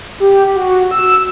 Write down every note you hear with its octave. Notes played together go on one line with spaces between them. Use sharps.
G4
F#4
E6